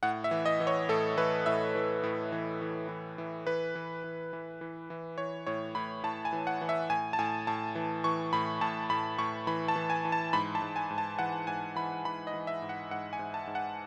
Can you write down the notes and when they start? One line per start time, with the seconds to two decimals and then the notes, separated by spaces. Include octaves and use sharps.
0.03 A2 F#5
0.24 E5
0.31 E3
0.46 D#5
0.60 E3
0.67 C#5
0.89 A2 A4
1.17 E3 B4
1.46 A2 E5
1.75 E3
2.03 A2
2.32 E3
2.61 E3
2.89 E3
3.18 E3
3.47 E3 B4
3.75 E3
4.04 E3
4.33 E3
4.61 E3
4.90 E3
5.18 E3 C#5
5.47 A2 C#5
5.75 A2 B5
6.03 A2 A5
6.25 G#5
6.33 E3
6.47 F#5
6.61 E3
6.69 E5
6.90 A2 G#5
7.13 A5
7.19 A2 G#5
7.47 A2 A5
7.75 E3
8.04 E3 C#6
8.33 A2 B5
8.61 A2 A5
8.90 A2 B5
9.19 A2 C#6
9.47 E3 B5
9.68 A5
9.76 E3
9.90 G#5
10.05 E3
10.12 A5
10.33 G#2 B5
10.55 A5
10.62 G#2
10.76 G#5
10.91 G#2
10.98 A5
11.19 E3 F#5
11.47 G#2 G#5
11.76 E3 B5
12.05 E3 B5
12.27 D#5
12.34 E3
12.47 E5
12.62 G#2
12.69 F#5
12.91 G#2 F#5
13.13 G#5
13.19 G#2
13.34 A5
13.47 G#2
13.55 F#5